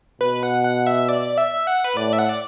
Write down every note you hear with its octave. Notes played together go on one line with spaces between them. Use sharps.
B2 B4
F#5
F#5
E5
D5
E5
F#5
B4
A2 D5
E5
F#5
D5